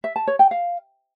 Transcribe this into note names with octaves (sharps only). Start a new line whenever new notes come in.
E5
A5
C#5
G5
F5